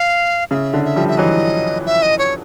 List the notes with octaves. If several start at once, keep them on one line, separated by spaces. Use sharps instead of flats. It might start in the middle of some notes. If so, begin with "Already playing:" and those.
Already playing: F5
C#3 E5 F5
D3
E5
F3 G3
E5
E3 F#3 D#5
E5
D#5
C#5